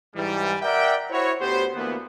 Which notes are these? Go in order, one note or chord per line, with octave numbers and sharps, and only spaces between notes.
G#2 E3 G3
A#4 D5 E5 F#5 G5
E4 F#4 C5 C#5
D2 B3 G4 C5
D2 E3 A#3 B3